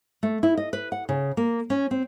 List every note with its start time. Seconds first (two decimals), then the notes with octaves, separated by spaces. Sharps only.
0.23 A3
0.43 E4
0.57 D#5
0.73 B4
0.92 F#5
1.09 C#3
1.37 A#3
1.70 C#4
1.91 C4